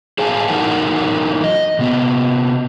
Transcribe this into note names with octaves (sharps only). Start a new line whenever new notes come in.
G#4 C5 F5 G#5 A5
E3 F#3 D#4 A#4 F#5
D#5
C3 B3